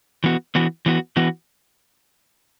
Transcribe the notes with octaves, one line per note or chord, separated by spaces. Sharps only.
E3 B3 F#4
E3 B3 F#4
E3 B3 F#4
E3 B3 F#4